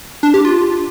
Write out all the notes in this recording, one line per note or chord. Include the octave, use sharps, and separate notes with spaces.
D4
G4
F4